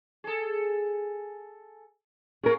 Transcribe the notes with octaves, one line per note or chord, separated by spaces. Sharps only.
G#4 A4
A#3 C#4 G#4 A#4